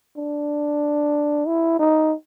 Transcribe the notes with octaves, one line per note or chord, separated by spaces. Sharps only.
D4
E4
D#4